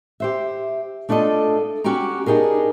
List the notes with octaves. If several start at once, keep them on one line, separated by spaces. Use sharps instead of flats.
G4 C5 E5
A3 D4 F4 A4 D#5
C#4 F#4 G4 G5 A#5
D4 D#4 G4 G#4 A#4